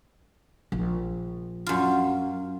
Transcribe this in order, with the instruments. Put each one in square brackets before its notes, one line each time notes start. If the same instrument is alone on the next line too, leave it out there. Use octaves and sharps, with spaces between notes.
[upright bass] A#1
[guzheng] F#2 F4